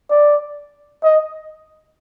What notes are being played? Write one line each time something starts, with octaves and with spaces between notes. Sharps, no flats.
D5
D#5